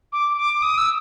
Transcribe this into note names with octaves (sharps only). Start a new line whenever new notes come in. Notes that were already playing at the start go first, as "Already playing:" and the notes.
D6
D6
D#6
E6